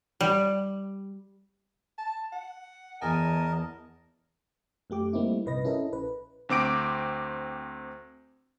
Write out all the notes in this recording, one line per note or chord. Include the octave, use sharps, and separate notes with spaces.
G3
A5
F#5
E2 A#4 D#5 G#5 A5
F#2 A3 G4 D6
G3 A3 A#3 C4 D#4 E4
A#1 G2 C3 B4 D#5 A#6
C#4 E4 A4 A#4 D#5
A#1 B4
D2 C4 D6 D7